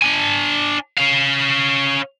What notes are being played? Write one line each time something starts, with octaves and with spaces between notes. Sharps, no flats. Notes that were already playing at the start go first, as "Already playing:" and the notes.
D4 G#5
C#4 F5